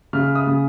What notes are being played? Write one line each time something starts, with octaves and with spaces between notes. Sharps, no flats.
C#3 F6
D#6
C#3